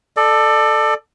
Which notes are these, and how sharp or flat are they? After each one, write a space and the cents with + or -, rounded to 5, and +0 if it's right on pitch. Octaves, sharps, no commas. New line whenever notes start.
A4 +0 D5 +30